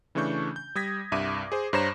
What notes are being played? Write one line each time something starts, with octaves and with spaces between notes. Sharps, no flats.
C#3 E3 A3 D4 C#6 G6
G6
G3 D#6 G#6 A#6 B6
C2 G2 E5 D6 D#7
G#4 C5
G2 C5 C#5 A#5 A#6 E7